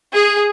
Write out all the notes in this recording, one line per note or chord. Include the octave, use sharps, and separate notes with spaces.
G#4